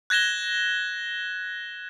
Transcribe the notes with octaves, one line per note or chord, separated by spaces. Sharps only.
F#6 G#6 A#6 E7 G7